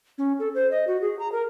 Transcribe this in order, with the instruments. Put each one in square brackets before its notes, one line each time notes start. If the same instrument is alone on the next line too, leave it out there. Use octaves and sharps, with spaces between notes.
[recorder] C#4
A4
C5
D#5
F#4
G#4
A#5
A#4